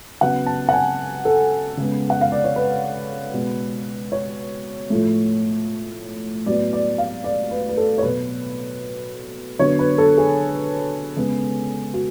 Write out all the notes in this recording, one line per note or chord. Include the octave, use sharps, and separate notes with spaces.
C#3 F#3 B3 F#5
A5
F#5
G#5
A4
C#3 G#3 B3
F#5
F5
D5
C#5
B4
B2 G#3 B3
C#5
A2 F3 A3
A2 F#3 B3 D5
D5
F5
D5
B4
B4
A4
C#5
B2 F#3 B3 B4
D3 F#3 B3 C#5
B4
A4
G#4
C#3 G#3 B3
F#4